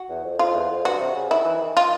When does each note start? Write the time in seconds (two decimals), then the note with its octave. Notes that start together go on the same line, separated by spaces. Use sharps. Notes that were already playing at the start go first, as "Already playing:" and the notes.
Already playing: F#4
0.09 E2
0.24 F2
0.39 F2 F4
0.54 E2
0.70 F2
0.84 G2 F#4
1.00 C3
1.15 C#3
1.31 D#3 E4
1.45 E3
1.61 D#3
1.75 D#3 F4